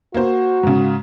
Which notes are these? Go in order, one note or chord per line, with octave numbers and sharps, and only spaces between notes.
A#3 F#4 C5
G#2 C#3